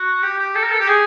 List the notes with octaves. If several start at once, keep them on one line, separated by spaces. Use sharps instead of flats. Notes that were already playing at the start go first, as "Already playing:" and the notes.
Already playing: F#4
G4
G4
A4
A#4
A4
G4
G#4